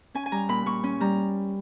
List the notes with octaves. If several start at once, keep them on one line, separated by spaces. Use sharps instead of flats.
C#4 G#5
G#5
G3 A#5
A#2 B5
A#2 C#6
C#4
G3 A#5